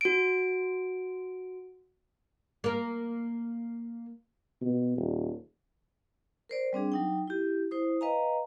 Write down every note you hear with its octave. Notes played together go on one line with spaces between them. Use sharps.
F#4 D7
A#3 A#4
B2
D#1
A#4 C5 D5
G3 C4 D4 G#4
F#3 D#4 G5
E4 G4
E4 C5 D#6
B4 D#5 F5 G#5 A#5